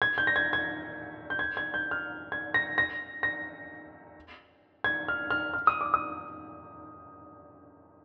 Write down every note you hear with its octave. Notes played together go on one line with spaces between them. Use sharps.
G#6
G6
A#6
G#6
G#6
G6
G#6
G#6
G6
F6
G#6
A#6
A#6
A#6
G#6
F6
F6
F6
D#6
D6
D#6